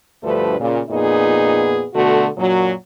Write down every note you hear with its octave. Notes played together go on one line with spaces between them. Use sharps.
D2 G2 F3 A3 B4
A#2 C#3
F2 A#2 B3 D#4 G#4
B2 D3 A3 F#4
F#2 A#2 F#3